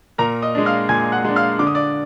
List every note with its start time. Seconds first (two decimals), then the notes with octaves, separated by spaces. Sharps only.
0.18 A#2 A#4 A#5
0.42 D#5 D#6
0.55 G#3 D4
0.66 F5 F6
0.89 A#2 G#5 G#6
1.12 F#5 F#6
1.24 G#3 D4
1.36 F5 F6
1.59 D3 D6
1.67 D#6
1.75 D5 D6